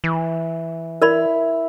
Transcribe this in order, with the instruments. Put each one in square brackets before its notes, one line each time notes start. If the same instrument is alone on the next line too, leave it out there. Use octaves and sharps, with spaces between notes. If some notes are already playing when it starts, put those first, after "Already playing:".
[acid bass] E3
[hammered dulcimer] E4 [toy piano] A#4 D5 B5